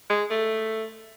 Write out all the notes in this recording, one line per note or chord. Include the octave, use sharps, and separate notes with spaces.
G#3
A3